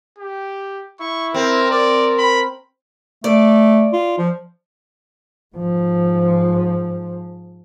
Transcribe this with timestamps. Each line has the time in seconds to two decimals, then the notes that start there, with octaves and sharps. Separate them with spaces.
0.19 G4
1.00 E4 C#6
1.34 C4 A#4
1.71 A#4 D5
2.18 B5
3.24 A3 D5
3.93 F4
4.18 F3
5.56 G#2 F3